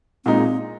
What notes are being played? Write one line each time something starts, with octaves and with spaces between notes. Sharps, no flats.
A#2 G#3 C4 D#4